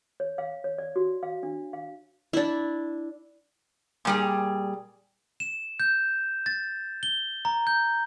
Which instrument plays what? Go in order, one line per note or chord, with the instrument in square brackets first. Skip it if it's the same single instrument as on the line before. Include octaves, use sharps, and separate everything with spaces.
[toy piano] C#5
F5
C#5
D5
F#4
F5
D4
F5
[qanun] D4 E4
[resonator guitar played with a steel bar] A#2 G3 G#4
[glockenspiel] E7
G6
A6
G7
A#5
G6